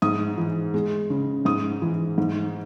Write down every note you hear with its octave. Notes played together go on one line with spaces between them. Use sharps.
G#2 D#6
E3
G#3
C#3
G#2 D#6
E3
G#2